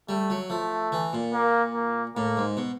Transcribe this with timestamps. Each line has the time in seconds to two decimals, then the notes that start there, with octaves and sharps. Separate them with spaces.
0.09 G3 A3
0.30 F#3
0.50 F3 A3
0.92 E3
1.13 A#2
1.34 A#3
1.74 A#3
2.16 A2 A#3
2.37 G#2
2.57 B2